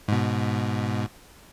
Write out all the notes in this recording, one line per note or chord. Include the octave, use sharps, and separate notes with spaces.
G#2 B2